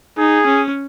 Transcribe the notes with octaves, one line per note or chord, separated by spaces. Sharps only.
D#4 G#4
C#4